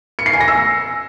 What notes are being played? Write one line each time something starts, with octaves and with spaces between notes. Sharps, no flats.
C#7
C7
G#5
A#6
E6